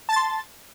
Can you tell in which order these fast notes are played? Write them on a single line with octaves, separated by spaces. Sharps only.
A5 A6 C6